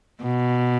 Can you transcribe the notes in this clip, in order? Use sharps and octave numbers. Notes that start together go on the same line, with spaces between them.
B2